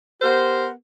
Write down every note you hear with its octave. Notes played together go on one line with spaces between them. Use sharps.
B3 G4 A#4 C5